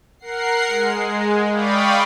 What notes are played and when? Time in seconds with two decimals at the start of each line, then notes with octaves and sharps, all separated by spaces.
0.19 A#4 F#5 C7
0.68 G#3
1.51 D5 F5 G5 B5 C#6 D#6